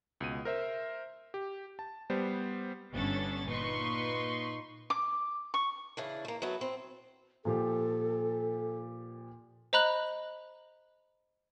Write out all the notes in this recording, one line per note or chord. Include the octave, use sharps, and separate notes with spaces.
C#2 B2 D#7
A#4 C5 E5
G4
A5
G3 B3 C5
G1 B3 C#4 D4 A4 A6
A#2 D#4 B4 C6 C#6
D6
C#6
C#3 E3 D4
A3 A#3
F#3 A3 B3
C4
A#2 F3 G4 A4
C5 D#5 A#5 B5 F#6 F#7